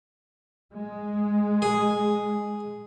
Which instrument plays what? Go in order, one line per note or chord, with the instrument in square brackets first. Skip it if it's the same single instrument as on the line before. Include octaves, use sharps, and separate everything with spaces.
[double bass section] G#3
[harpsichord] G#4